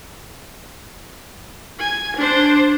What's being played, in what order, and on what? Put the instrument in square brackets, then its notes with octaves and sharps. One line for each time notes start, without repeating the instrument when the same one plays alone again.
[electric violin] G#5
D4 C5